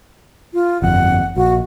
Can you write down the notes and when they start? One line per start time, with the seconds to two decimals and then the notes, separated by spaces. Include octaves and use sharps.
0.54 F4
0.82 G1 F2 F#5
1.36 A#1 F#4